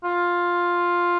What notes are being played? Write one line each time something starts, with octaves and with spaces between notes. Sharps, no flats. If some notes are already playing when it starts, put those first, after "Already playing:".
F4